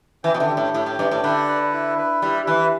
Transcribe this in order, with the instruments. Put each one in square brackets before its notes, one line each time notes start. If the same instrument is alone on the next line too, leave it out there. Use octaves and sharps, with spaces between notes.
[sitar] E3 [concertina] G5
[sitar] B2
D3
[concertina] G4
[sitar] A2
[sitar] A2 [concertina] G5
[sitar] A2
[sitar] G2 [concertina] D5
[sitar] A2
[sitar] D3 [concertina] B4
[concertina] B4
E4
B4
[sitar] G3 [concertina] E4
[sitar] E3 [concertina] B4